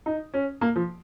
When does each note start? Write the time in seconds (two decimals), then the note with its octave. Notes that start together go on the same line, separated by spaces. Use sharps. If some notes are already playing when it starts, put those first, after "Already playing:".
0.06 D#4
0.34 C#4
0.61 A#3
0.76 F3